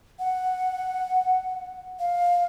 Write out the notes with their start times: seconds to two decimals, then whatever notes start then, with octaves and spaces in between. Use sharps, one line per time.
0.19 F#5
1.99 F5